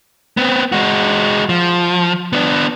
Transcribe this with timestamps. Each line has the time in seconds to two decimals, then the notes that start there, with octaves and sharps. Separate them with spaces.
0.37 B3 C4
0.72 G#3 F#4
1.49 F3
2.33 B3 D4